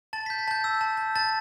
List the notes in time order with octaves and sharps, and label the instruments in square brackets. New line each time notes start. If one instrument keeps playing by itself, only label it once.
[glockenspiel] A5 A6
G6 B6
A6
A5 G6
E6
A5
G6
A5 A6